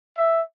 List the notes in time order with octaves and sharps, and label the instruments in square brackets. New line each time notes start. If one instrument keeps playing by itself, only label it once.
[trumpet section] E5